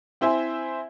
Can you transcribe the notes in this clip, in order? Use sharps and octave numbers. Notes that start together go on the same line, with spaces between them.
C4 E4 C5 E5 G#5